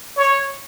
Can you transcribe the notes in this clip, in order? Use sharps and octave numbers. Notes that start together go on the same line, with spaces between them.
C#5